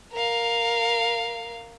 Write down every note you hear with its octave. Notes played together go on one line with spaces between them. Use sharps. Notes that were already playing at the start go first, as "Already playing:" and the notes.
A#4 F5